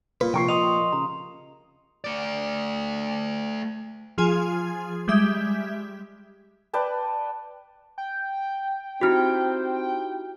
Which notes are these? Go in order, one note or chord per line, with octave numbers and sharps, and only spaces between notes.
A#2 B4
C3 F3 G5 C#6 C7
D#5 C6 D#6 F7
C#3 A#5
A3 D5
F3 F4 G#4 G#5
G3 G#3 G4 E5
B4 D5 G5 A5
G5
C4 D#4 E4 F#4 G4 F6